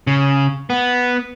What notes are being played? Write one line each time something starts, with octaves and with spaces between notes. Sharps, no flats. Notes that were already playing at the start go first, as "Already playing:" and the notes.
C#3
B3